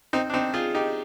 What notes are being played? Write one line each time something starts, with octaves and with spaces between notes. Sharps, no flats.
C4 D#4
D4
C4 D#4
F4 G#4
D#4 G4